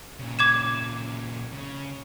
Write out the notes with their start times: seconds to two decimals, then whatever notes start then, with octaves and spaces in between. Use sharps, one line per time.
0.19 A#2 C#3
0.39 D6 G#6 E7
1.53 C#3